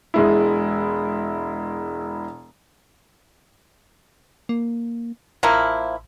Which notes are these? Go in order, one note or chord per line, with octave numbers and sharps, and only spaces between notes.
E1 G#3 E4
A#3
A1 F3 A#3 E4